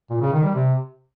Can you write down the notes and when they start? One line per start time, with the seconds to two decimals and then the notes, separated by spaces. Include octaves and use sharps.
0.10 A#2
0.21 C#3
0.32 D#3
0.43 G3
0.54 C3